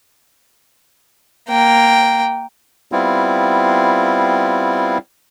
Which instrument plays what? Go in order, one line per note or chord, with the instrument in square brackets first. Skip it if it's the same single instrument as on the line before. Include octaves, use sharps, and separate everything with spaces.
[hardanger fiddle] A#3 G5
[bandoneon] G3 B3 C4 E4 F4